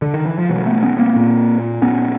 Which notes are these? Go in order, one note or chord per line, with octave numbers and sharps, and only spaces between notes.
D3
D#3
E3
F3
B2 E3 F#3
A3 B3
B3 C#4
A#3 C4
A#2
A#2 B3 C#4